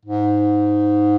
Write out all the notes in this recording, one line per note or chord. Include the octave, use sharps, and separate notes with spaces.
G#2